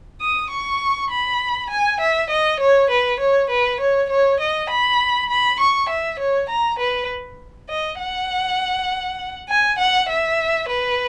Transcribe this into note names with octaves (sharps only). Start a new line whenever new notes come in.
D#6
C#6
B5
G#5
E5
D#5
C#5
B4
C#5
B4
C#5
C#5
D#5
B5
B5
C#6
E5
C#5
A#5
B4
D#5
F#5
G#5
F#5
E5
B4